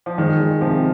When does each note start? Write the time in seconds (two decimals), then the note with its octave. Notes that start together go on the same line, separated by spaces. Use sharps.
0.06 F3
0.18 D#3 G#3
0.40 G#3
0.61 C3 F3